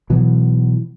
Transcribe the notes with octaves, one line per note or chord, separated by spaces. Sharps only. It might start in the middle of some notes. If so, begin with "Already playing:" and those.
B2 E3 F#3